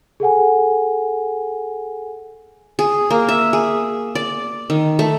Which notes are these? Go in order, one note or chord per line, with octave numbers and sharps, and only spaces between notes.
G#4 A4 F#5 G#5
G#4
A#3
E5
G#4
D5
D#3
A3